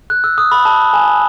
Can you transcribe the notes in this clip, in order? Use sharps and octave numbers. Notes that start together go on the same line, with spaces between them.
F#6
E6
D#6
B5
A5
G#5